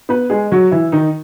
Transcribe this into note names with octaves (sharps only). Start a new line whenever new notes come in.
B3 B4
G#3 G#4
F#3 F#4
E3 E4
D#3 D#4